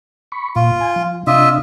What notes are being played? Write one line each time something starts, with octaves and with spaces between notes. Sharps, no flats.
B5 C#6
A#2 F4
G#5
F3
C3 D4 F4 D#5 E5